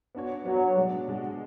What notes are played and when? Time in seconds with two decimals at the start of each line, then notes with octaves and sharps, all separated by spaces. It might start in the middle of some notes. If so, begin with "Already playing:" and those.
0.15 B3 D4 F#4 C#5
0.46 F#3 B3 D4 F#4 C#5
0.76 B2 G#3 D4 F#4
1.08 B2 G#3 D4 F#4